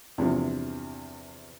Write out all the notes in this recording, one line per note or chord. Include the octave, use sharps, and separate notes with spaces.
E2 G2 C3 F3